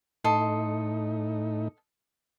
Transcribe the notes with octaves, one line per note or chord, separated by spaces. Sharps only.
A2 D#4 A4 D#5 C6